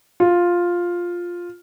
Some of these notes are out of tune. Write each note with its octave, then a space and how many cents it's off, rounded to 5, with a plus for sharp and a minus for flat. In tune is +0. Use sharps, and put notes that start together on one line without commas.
F4 +5